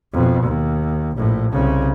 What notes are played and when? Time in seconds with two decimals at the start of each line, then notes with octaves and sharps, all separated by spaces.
0.13 F2 B2
0.42 D#2
1.16 A#1 A2
1.52 C2 C#3